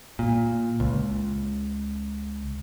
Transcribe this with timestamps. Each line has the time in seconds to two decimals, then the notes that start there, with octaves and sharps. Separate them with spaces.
0.19 A#2
0.80 C#2